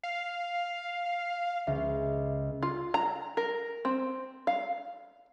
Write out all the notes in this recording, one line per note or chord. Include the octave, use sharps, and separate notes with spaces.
F5
C#2 E5
F4
A#5
A#4
C4
F5